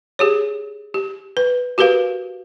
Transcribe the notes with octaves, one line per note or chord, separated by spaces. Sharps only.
G4 G#4 C#5
G4
B4
F#4 G4 A#4 B4 F5